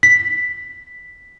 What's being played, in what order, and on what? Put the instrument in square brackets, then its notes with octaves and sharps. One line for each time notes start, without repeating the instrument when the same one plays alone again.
[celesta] B6